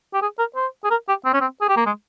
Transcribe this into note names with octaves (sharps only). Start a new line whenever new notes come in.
G4
G#4
A#4
C5
G#4
A#4
G4
C4
C#4
C4
G#4
G4
A#3
G#3